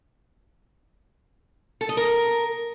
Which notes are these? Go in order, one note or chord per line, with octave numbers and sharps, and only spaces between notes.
A4
D#5
A#4